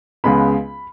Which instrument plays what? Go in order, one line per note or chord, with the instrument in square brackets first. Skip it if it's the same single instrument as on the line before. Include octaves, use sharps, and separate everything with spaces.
[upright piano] C#2 C#3 G#3 B3 B5